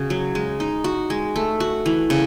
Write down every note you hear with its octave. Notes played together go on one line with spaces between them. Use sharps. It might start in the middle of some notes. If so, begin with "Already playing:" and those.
Already playing: C#3 F#4
F#3
G#3
D#4
F#4
G#3
A3
F#4
E3
C#3